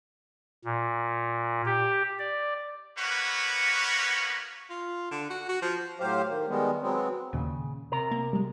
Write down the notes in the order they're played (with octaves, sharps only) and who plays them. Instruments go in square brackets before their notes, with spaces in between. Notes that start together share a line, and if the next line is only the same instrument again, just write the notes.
[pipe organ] A#2
G4
D5
[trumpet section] A#3 B3 F#4 B4 C#5
[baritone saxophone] F4
D3
F#4
F#4
F3
[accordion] A2 F#3 G4 C5 F5
D#3
D#3 G3 G#3 B3
F#3 G#3 B3 C4
[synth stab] D#2 A#2 [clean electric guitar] C#3
[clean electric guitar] C3 A#4 A#5
[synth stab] A#3
G3 G#3